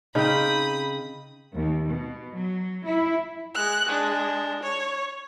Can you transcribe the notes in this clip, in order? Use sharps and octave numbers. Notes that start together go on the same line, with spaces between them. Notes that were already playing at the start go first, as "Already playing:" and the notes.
C#3 C4 D#4 G5 B5 D#6
D#2
B2
F#3
E4
G#3 F#6
G#3 D4
C#5